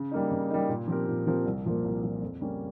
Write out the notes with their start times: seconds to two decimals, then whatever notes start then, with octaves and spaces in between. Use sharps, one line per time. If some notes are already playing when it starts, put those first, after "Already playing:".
Already playing: C#3
0.11 G3 A#3 D#4
0.31 C#3
0.50 G3 A#3 D#4
0.69 A#2
0.88 F3 C4 G4 A#4
1.08 A#2
1.27 F3 C4 G4 A#4
1.46 C2
1.65 A#2 F3 A#3
1.84 C2
2.03 A#2 F3 A#3
2.22 F2
2.41 C#3 G3 A#3 C#4